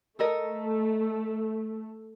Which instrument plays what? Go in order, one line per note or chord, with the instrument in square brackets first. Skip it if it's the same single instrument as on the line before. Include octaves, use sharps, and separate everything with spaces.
[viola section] A3 [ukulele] A4 A#4 D#5